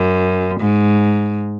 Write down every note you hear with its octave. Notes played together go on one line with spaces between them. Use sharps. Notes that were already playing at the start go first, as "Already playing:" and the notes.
Already playing: F#2
G#2